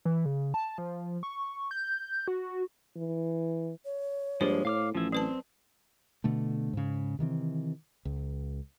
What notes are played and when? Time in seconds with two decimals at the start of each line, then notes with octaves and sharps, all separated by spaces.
0.05 E3
0.25 C#3
0.54 A5
0.78 F3
1.23 C#6
1.71 G6
2.28 F#4
2.97 E3
3.85 C#5
4.41 G2 F3 G#3 A#3 C5
4.65 A2 F5 D6 F6
4.95 A1 F3 E4
5.12 F#3 C4 B4 A5
6.24 B2 D3 A3
6.73 G#2 C#3
7.19 C3 D#3 E3 C4
8.05 C#2